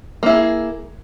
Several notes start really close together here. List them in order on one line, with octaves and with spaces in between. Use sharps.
A#3 E4 G#4